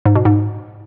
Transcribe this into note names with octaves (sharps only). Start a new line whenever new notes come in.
G#2
B2
G#2